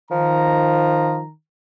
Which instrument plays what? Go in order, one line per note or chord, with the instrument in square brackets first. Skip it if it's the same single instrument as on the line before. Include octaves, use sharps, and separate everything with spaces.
[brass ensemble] D#3 A#5 [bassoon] F3